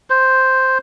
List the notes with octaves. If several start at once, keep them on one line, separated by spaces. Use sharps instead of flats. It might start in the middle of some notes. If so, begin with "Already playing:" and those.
C5